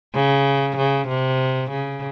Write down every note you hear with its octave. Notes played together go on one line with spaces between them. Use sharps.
C#3
C#3
C3
C#3